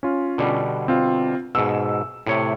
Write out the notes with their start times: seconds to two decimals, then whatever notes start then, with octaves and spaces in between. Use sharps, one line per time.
0.03 C#4 F4
0.38 B2 D3 G3
0.88 C4 F4
1.55 G#2 B2 E6
2.26 A2 C3 C#5